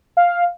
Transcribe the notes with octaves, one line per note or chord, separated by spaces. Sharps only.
F5